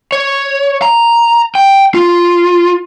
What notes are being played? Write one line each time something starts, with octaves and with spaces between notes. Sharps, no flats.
C#5
A#5
G5
F4